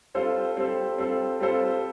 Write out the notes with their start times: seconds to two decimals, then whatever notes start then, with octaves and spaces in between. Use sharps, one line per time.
0.14 G3 C4 F4 A4 C5
0.56 G3 C4 F4 A4 C5
0.98 G3 C4 F4 A4 C5
1.40 G3 C4 F4 A4 C5